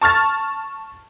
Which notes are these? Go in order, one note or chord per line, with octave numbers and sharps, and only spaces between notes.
A5 C#6 F6 A6